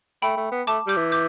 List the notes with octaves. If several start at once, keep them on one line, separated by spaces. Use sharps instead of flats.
A3 G5 B5
A3
B3
A3 A5 D6
G3 D6 G6
E3
D6 G6